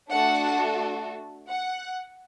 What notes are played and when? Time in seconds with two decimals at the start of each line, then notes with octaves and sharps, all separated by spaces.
0.10 A3 D4 F#4 A4 F#5
1.48 F#5